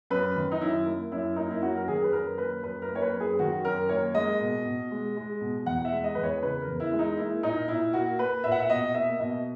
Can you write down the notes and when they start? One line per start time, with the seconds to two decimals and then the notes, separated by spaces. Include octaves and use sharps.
0.10 F#2 B4
0.36 D#3
0.52 D#4
0.61 F#2 E4
0.86 A#3
1.12 F#2 E4
1.36 A#3 D#4
1.51 E4
1.62 F#2 F#4
1.77 A#4
1.87 D#3 G#4
2.04 B4
2.12 F#2 A#4
2.37 A#3 B4
2.63 F#2 B4
2.82 A#4
2.88 A#3
2.95 C#5
3.02 B4
3.14 F#2
3.20 G#4
3.39 D#3 F#4
3.64 F#2 A#4
3.89 A#3 C#5
4.14 G#3 D#5
4.41 B2
4.65 B2
4.91 G#3
5.17 G#3
5.41 B2
5.66 E2 F#5
5.85 E5
5.91 G#3
6.04 D#5
6.15 E2 B4
6.23 C#5
6.42 C#3 B4
6.62 A#4
6.67 E2
6.80 E4
6.92 G#3
6.99 D#4
7.17 A#3 E4
7.43 A#2 D#4
7.68 A#2 E4
7.93 A#3 F#4
8.19 A#3 B4
8.44 A#2 E5
8.52 F#5
8.59 E5
8.70 B2 D#5
8.95 A#3 E5
9.20 B2 D#5